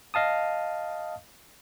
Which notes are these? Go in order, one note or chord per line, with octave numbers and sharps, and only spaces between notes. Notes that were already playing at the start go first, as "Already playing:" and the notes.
D#5 F5 A5 D#6